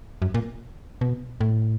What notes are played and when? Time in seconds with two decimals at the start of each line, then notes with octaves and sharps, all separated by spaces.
0.22 F#2
0.34 A#2
1.01 B2
1.41 A2